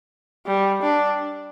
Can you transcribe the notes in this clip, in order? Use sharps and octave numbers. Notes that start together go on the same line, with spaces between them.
G3
D4